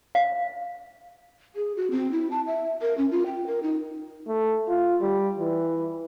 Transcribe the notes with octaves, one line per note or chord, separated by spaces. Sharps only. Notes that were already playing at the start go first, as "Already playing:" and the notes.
F5
G#4
F#4
C4
E4
A5
E5
A#4
C#4
F4
G5
A#4
D#4
A3
F4
G3
E3